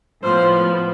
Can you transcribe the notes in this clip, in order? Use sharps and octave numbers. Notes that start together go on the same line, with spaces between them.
A2 F3 B3 C5